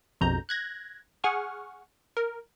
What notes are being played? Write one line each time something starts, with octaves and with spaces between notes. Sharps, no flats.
A#1 F2 B2 A#5 G6
F#6 G#6 A#6
G#4 F#5 G#5 C#6 F6
A#4